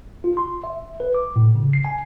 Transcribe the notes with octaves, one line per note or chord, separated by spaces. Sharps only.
F4
C6
E5
B4
D6
A2
C#3
C7
G#5